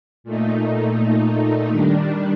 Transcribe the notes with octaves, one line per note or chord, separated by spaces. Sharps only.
A#2 A3 D#4
D#3 G3 D4